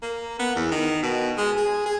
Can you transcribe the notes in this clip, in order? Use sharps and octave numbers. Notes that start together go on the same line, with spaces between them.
A#3
B3
E2
D#3
B2
G#3
G#4
G#4